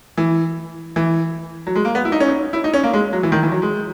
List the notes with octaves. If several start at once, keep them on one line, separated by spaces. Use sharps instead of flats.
E3
E3
F#3
G#3
A#3
B3
E4
D#4
C#4
D#4
E4
D#4
C#4
A#3
G#3
F#3
E3
D#3
E3
F#3
G#3